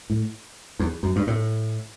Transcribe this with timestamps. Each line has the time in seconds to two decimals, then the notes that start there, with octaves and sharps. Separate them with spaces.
0.10 A2
0.79 E2
1.03 F#2
1.16 G2
1.27 A2